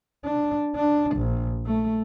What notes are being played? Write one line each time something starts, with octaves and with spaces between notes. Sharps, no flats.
D4
D4
A#1
A3